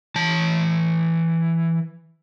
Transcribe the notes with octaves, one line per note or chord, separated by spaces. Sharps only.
E3 A5